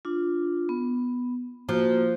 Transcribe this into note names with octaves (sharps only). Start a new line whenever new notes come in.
D4 F4
B3
F3 A#3 F#4